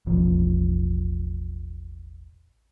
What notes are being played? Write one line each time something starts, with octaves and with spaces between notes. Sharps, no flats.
E1 A1 F3